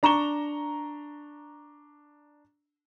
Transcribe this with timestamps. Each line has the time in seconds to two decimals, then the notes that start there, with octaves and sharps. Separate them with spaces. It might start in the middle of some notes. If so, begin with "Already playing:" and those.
0.03 D4 A#5 C#6 E7 G7